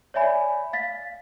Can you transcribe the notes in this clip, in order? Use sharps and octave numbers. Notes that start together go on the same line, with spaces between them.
C#5 D5 E5 G#5 B5
F5 A6 B6